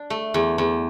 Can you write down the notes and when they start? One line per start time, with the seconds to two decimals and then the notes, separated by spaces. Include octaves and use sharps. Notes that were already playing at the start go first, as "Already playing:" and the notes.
Already playing: D4
0.10 A3
0.34 E2
0.58 E2